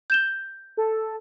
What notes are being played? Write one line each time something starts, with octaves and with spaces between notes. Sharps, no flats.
G6 E7 G7
A4